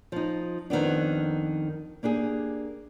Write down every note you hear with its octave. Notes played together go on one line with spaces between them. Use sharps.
F3 D#4
F2 D#3 A#3 B3 D4
A#3 D4 G4 G#4